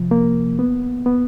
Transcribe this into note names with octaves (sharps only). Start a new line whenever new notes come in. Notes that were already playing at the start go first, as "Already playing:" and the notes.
Already playing: C3 F3
A#3
B3
B3